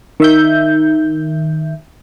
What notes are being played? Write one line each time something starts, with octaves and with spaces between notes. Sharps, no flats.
D#3 E5 G6